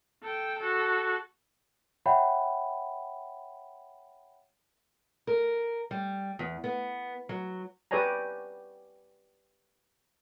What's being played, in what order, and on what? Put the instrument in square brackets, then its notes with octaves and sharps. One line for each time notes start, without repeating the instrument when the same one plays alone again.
[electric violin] A4 G5
F#4 A4
[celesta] C#5 E5 F#5 G5 B5
[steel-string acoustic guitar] A#4
G3
E2
B3
F#3
[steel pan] G4 B4 C#5 D5 G#5 A#5